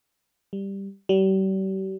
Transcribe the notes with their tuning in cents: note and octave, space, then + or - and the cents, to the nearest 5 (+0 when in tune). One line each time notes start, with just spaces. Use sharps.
G3 +5
G3 -40